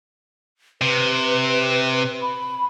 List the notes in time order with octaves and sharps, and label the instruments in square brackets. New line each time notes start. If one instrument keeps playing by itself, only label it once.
[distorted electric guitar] C3 [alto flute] B4
[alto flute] B5